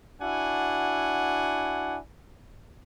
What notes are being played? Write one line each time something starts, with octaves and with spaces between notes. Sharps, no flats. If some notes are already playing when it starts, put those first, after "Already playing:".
D4 E4 F#4 F#5 G#5